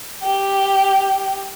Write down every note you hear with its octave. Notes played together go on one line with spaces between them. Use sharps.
G4